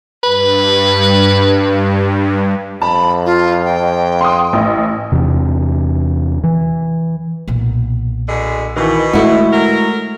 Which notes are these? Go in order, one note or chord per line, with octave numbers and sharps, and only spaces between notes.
G2 B4
F2 A5 B5
F4
G5
C6 D#6
A1
E2 C3
E3
B1 A#2
B2 D3 G#3
B2 D#3 E3
D3 G#3 A3 E4 F#4
F#3 A#4